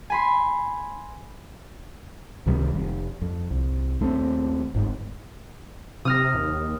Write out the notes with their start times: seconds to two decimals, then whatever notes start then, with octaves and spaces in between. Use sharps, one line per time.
0.10 G#5 B5 C6
2.46 C#2 C3 D#3 G3
2.74 F1
3.21 F2
3.51 C2
4.00 D#2 A3 A#3 C4
4.74 G1 G#2
6.05 C3 D#6 F6 A#6
6.35 D#2